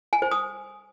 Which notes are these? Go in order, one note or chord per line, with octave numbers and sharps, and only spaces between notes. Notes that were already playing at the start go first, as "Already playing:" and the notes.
G#5
C5
D#6